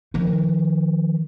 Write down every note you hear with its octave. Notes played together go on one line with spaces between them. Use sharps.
D#3 F3